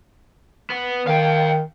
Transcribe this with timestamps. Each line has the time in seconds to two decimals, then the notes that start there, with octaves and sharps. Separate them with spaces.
0.70 B3
1.07 D#3 F5 G5